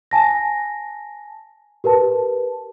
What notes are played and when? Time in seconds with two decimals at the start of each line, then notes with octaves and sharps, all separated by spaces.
0.11 G#5 A5 A#6
1.84 G4 A#4 B4 A5